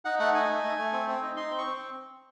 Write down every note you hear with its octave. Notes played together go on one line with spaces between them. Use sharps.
D#4 F#5
A3 F#5
D#4 G#5
A3
A3
A3
C4
C4
D#4
D#4 C6
C4
C#6
C4